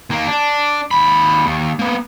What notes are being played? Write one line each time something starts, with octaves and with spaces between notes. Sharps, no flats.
D#2 A#3
D4
D#2 B5
D#2
A#3 B3